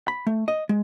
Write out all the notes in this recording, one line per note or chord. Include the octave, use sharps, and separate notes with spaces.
B5
A3
D#5
G#3